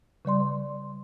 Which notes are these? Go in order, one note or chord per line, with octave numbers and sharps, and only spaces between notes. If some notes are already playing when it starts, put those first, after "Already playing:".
C#3 G3 D5 C6